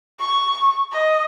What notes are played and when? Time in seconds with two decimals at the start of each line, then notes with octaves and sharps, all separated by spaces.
0.19 C#6
0.92 D#5